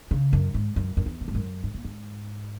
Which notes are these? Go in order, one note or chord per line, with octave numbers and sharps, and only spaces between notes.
C#3
F#2
G#2
F#2
F#2
E2
A#2
G#2
F#2
G#2
A#2
G#2